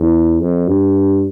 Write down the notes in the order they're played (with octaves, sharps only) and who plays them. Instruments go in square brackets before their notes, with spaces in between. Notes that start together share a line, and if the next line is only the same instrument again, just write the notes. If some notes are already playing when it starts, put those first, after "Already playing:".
Already playing: [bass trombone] E2
F2
G2